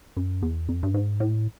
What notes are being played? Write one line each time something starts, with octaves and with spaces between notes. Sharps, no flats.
F#2
E2
F2
G2
G#2
A2